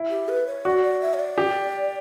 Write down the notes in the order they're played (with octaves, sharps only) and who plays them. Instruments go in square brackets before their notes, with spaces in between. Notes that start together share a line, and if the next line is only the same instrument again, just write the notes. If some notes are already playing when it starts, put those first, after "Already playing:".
Already playing: [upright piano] E4
[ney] G4
B4
C#5
[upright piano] F#4 [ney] D5
[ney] D5
E5
C#5
D5
[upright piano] G4